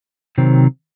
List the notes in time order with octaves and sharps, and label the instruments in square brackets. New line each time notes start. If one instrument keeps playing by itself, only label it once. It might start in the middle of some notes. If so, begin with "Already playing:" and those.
[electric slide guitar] C3 D#3 F#3 C4